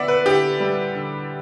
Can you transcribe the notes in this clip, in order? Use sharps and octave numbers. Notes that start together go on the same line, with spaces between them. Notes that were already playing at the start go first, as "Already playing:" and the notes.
Already playing: D3 B3 D5 E5 F#5
B4
D3 G4
G3
D3